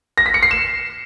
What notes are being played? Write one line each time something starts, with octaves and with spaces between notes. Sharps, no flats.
A#6
B6
C#7
C7
E7